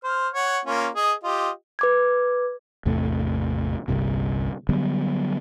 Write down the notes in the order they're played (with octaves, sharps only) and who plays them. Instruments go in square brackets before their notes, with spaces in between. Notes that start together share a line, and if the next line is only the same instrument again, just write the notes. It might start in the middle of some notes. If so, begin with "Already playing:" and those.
[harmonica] C5 F6
C#5 F#5
A#3 C#4 F4
G#4 D#5
F4 G4 D#5
[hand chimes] B4 D6 G#6
[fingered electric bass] A1 E2 C3 A3
G1 C2 G2 C3
D3 F#3 G3 B3